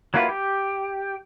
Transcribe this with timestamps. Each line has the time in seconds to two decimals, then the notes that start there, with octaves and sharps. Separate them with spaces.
0.14 F#3 A#3 E4 F4 B4
0.29 G4